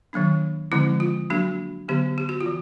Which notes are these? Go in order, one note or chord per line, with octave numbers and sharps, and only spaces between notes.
D#3 F#3 A#3 D4
D3 F3 G#3 C4 E4
F4
F#3 A#3 D4 F#4
D3 F#3 B3 G4
G4
F#4
F4
E3